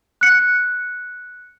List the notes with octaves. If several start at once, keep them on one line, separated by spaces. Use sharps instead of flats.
F#6 C#7